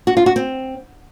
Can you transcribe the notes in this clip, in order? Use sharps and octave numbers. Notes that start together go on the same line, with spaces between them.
F#4
F4
F#4
C4